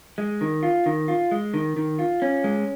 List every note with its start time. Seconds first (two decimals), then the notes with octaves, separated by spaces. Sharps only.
0.18 G#3
0.41 D#3
0.63 F4
0.86 D#3
1.08 F4
1.31 G#3
1.54 D#3
1.77 D#3
1.99 F4
2.22 C#4
2.44 G#3